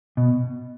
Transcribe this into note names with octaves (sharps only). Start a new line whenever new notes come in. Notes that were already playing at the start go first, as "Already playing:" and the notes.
B2